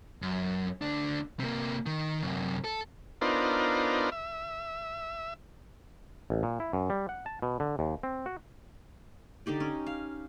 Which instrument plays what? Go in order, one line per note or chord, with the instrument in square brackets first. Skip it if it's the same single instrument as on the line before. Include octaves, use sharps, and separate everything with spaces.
[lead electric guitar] F#2
D2 D4
C3 A#3
D#3
F#2 C3
A4
[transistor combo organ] B3 D4 D#4 F4 A#4 C5
E5
[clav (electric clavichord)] A1
A#2
E4
F#2
G3
F#5
A5
B2
D3
D#2
C4
F#4
[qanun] D3 D#4 G4 D5
C#4
F5